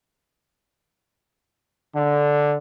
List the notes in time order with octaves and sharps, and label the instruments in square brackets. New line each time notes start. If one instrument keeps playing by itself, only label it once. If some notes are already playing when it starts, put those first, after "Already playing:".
[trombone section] D3